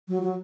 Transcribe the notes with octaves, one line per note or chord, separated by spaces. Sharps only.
F#3
F#3